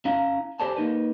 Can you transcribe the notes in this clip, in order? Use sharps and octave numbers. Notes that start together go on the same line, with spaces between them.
C#4 E4 F5 A#5
G4 A4 C5 D5 G#5 A5
A#3 C4 D#4 B4